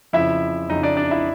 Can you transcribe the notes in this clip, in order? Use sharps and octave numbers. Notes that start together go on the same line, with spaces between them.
F2 C#3 F3 E4 E5
F2 C#3 F3 D#4 D#5
D4 D5
D4 D5
E4 E5